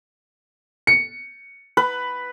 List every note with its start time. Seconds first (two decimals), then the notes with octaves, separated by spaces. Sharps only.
0.87 C#7
1.77 B4